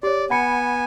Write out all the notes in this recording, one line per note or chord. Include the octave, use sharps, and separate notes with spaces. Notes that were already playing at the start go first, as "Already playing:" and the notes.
G4 C#5 D5
B3 F#5 G#5 B5 C#7